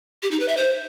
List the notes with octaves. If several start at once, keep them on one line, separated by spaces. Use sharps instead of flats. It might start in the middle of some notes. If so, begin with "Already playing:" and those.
G4
D#4
B4
E5
C5